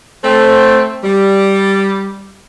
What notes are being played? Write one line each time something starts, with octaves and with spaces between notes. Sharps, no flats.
A3 C4
G3